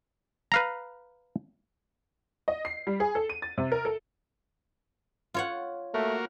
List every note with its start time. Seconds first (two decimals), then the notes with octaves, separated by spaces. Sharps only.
0.52 B4 F5 A#5
2.48 D#5
2.65 C7
2.87 G3
3.00 G#4
3.15 A4
3.30 D#7
3.42 A6
3.58 C3
3.72 A#4
3.85 A4
5.34 F4 C#5 F#5
5.94 A3 A#3 F#4 A#4